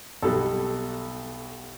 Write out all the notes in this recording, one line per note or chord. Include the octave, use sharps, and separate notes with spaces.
B1 B2 G3 A4